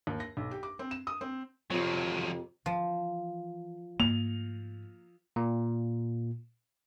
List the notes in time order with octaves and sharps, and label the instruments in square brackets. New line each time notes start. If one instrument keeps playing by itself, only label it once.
[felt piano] D#2
A#6
B1
G4
D6
C4
E7
D#6
C4
[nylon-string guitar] F2 C3 [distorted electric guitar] F3 F#3
[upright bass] E3 [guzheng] F3
[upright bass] G#2 A3 [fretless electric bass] A#3 [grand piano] F7
[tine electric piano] A#2